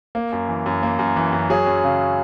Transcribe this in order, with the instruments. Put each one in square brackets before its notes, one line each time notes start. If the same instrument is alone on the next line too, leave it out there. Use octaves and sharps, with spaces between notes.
[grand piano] A#3
F#2
E3
F#2
A#3
F#2
E3
F#2
F#3 G#4
F#2
C#3